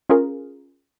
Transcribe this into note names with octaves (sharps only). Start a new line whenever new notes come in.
C#4 F4 G#4 A#4